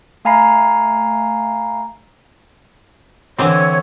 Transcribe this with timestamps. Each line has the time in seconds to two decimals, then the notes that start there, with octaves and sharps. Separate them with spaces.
0.25 A3 F5 G#5 A#5 B5 C7
3.39 D3 E3 C4 C#5